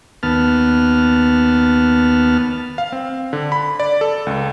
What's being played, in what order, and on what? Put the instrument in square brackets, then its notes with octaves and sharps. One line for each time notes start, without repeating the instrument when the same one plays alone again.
[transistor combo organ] D#2 B3 A5 F6
[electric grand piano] F5
C4
D3
B5
D5
A4
C#2